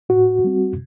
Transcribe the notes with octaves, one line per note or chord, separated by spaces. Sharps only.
A2 F#4
G3 C4